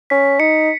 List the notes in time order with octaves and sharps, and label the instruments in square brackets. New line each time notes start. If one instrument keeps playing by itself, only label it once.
[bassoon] C#4 [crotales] B6
[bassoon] D#4 [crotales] C#7